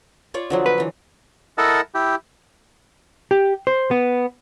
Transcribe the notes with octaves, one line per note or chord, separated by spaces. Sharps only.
F4 C#5 D5
D3 F3 F#3
B4
D3 E3
E4 A4 A#4 D#5 F#5 A5
E4 G4
G4
C5
B3